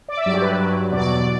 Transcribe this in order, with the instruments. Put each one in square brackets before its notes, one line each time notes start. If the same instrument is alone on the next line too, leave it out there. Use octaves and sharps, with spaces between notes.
[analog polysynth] D5
E5
G2 F#3 D5
G4
B4
G2 F#3
E2 B2 F#3 D5